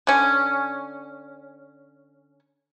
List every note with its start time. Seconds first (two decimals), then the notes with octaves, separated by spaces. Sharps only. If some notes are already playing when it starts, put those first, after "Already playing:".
0.07 D3 C#4